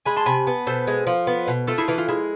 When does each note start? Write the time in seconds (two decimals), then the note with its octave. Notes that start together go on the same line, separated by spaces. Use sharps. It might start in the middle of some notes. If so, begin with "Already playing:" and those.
0.05 G#3 G#5 B5
0.16 A5 C6
0.26 C3 G#5 B5
0.47 B3
0.67 B2 A4 C5
0.87 G#3
1.07 F3
1.27 B3
1.48 B2
1.67 A3 F4 A4
1.78 E4 G#4
1.88 E3 F4
1.98 F4
2.08 G#3 E4